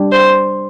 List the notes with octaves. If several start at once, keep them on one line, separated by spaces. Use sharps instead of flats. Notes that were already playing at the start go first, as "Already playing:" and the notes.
Already playing: G3 D4 G4
C5